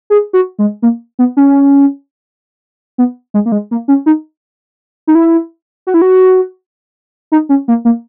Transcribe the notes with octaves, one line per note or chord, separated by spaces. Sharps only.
G#4
F#4
G#3
A#3
B3
C#4
B3
G#3
A#3
G#3
A#3
C#4
D#4
D#4
E4
F#4
E4
F#4
D#4
C#4
A#3
A#3